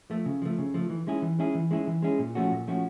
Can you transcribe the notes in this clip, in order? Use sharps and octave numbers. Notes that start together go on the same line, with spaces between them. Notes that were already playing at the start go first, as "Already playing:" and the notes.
F3 A3
C#3
F3 A3
C#3
F3 A3
E3
G#3 C#4 E4 G#4
E3
G#3 C#4 E4 G#4
E3
G#3 C#4 E4 G#4
E3
G#3 C#4 E4 G#4
A#2
F3 A3 C#4 F#4
A#2
F3 A3 C#4 F#4